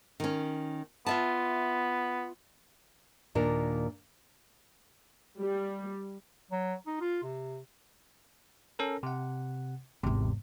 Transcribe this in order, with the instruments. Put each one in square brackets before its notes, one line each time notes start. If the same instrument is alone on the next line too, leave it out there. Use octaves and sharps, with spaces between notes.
[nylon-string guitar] D#3 C#4
[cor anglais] B3 [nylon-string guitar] F4 E5 A5
[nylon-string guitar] D#2 A#2 D4 A#4
[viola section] G3
[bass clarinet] F#3
D#4
F4
C3
[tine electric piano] C#4 A4 A#4
C3 F#5
[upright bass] G#1 E2 [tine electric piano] C3